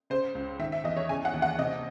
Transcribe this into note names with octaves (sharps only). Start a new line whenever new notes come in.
C#3 C5
C#2
D#3 E5
E5
E2 D#5
C#5
C#3 G#5
F#5
D#2
F#5
C3 D#5